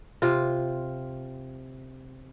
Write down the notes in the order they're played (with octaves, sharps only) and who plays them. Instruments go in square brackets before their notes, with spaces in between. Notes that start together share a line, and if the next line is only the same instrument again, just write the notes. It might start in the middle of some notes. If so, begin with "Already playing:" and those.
[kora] C3 F4